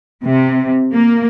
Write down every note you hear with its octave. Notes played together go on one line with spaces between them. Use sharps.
C3
A#3